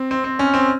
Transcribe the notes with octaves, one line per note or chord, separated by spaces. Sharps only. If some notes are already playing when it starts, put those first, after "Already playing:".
Already playing: C4
C4
C4
C#4
C4